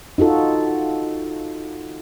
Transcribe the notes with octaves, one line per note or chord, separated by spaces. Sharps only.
D#4 F4 F#4 A4